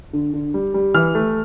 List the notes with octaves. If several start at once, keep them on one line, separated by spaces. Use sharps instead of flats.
D3
D3
G3
G3
E3 F6
A3